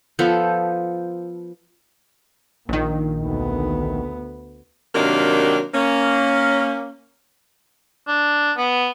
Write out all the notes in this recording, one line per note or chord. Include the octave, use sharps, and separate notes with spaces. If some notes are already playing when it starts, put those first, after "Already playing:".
F3 B3 A4 C5
A#1 A#2 D#3
D2 B3
C3 D#3 F#3 A#3 D4
A#3 C#4
D4
B3